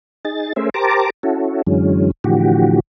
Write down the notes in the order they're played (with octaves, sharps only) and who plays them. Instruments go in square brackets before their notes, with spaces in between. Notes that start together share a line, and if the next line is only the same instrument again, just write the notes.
[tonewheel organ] D#4 G#4 A6
A3 C#4 G#4 A#4 C5 E5
G4 A#4 C5 A5 A#5 D6
C#4 E4 F#4 A4
F#2 D3 E3 F#3 G#3 C#4
A2 D3 E3 F3 F#4 G4